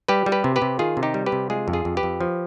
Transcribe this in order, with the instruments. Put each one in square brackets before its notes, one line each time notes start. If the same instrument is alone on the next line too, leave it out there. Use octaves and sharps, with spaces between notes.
[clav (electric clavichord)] G3 G4 B4
G3
G4 B4
C3
G4 B4
C3
D#3 F4 G#4
C3
D#4 G4
G3
G4 B4
C3
G#3 F4 G#4
F2
F4 G#4
F2
G4 B4
F2
F3